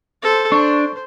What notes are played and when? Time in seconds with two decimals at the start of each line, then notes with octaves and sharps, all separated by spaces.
0.22 A4 C5
0.52 D4 C5 C#6